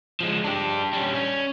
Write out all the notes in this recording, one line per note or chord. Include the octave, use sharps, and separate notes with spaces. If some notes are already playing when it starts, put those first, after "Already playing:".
F3 G#3
D4 G4
G3 C#4
C#4